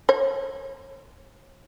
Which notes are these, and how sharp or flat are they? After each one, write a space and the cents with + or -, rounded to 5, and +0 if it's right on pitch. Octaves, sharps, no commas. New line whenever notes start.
C#5 -30